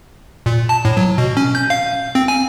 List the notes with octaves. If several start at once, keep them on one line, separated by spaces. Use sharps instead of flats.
A#2
A5
A2
F#3
B2
C#4
G6
F5
C4
G#5